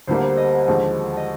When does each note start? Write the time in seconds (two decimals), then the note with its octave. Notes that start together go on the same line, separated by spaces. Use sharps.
0.07 D2 D3 G3 A#3 C5
0.23 C5
0.37 D#5
0.68 D#2 D3 F3 G#3
1.17 D#5